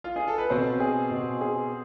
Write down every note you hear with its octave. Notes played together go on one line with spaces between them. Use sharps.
F4
G#4
A4
B4
B2 C4 C5
G#4
B2
G#4